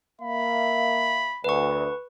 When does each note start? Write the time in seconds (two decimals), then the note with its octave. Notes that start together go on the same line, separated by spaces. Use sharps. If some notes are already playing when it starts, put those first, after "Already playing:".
0.21 A#3 E5 F5 B5
1.44 D2 B4 C#6